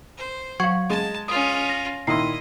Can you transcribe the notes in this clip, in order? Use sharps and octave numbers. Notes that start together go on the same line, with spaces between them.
C5
F#3 F5 G#6
G#3 A5
C#4 F4 D#6
A#6
A#2 D#3 E4 D#5 C6 C7